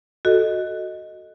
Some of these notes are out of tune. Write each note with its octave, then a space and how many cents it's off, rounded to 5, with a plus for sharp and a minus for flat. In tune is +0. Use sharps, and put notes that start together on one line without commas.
F#4 +0 A4 +0 D#5 +0